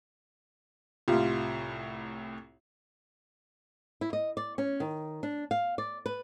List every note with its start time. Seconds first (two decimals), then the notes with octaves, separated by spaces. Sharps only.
1.08 C2 A2 F4 G4 F5
4.01 E4
4.13 D#5
4.37 D5
4.58 C#4
4.80 D#3
5.23 D4
5.51 F5
5.78 D5
6.06 B4